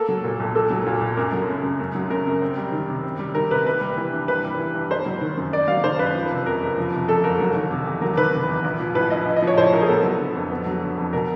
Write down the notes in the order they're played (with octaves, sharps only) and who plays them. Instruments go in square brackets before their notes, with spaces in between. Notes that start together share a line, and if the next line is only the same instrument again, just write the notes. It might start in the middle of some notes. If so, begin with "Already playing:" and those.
Already playing: [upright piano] A#3 [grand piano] A4
[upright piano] F#3
A#2
B1
[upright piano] A#3 [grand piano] A4
[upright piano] F#3
A#2
B1
[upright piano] F#2 [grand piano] A#4
[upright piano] F#3
C#3
F#2
F#2
F#3
[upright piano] C#3 [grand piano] A#4
[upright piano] F#2
C4
G3
D#3
C3
C4
G3
[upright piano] D#3 [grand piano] A#4
[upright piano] C3 [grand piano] B4
[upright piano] A#3 [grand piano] B4
[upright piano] G3
E3
G2
[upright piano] A#3 [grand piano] B4
[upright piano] G3
E3
G2
[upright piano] A#3 [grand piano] C5
[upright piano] F#3
D#3
F#2
[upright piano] A#3 [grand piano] D5
[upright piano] F#3 [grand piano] F5
[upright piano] D#3 [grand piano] C5
[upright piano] F#2 [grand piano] B4
[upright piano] F3
C3
[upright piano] F2 [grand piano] A#4
[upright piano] F#1
F3
C3
[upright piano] F2 [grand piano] A4
[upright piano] F#1 [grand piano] A#4
[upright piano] F#3
D#3
C3
E2
[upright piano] F#3 [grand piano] A#4
[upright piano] D#3 [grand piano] B4
[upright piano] C3
E2
A#1
F3
[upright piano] A2 [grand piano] B4
[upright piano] A#1 [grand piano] D#5
[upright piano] A#1
[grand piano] D#5
[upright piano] F3
[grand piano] C#5
[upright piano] A2 [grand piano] C5
[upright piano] A#1 [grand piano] A#4
[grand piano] G#4
[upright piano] B3 [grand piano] A4
[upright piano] F#3
D3
F2
B3
F#3
D3
F2
[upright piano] B2 [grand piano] A#4